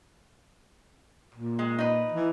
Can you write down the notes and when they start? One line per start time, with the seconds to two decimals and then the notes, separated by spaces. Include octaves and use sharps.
1.34 A#2
1.59 G#3
1.79 D#4 B4
2.12 E3